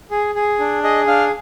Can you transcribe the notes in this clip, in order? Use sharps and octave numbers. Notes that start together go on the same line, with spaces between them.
G#4
G#4
D4
G#4 D#5
D4 F5